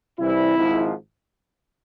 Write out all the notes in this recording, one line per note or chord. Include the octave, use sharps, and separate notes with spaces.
C2 C3 E3 G3 E4
G#1 G#2 F3